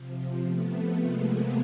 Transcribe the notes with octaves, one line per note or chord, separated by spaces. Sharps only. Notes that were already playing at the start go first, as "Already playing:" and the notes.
Already playing: C3 F3
A3 B3
G#3 A#3